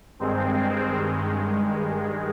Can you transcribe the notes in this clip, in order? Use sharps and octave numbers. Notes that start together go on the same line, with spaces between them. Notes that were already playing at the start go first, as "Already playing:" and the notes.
G2 D#3 G#3 C4